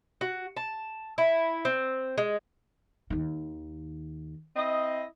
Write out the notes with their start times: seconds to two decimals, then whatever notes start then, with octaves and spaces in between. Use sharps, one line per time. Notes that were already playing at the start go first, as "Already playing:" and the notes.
0.21 F#4
0.57 A5
1.18 E4
1.65 C4
2.18 G#3
3.10 D#2 D#3
4.56 C4 E4 D#5